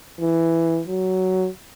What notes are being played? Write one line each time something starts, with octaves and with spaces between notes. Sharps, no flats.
E3
F#3